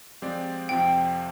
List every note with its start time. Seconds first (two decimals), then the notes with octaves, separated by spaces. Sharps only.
0.22 F3 G#3 C4 G4 D5
0.69 F2 C3 F3 C4 G5